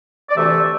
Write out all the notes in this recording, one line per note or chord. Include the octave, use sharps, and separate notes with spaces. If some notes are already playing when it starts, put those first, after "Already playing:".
D5
D2 C3 E3 A3 E5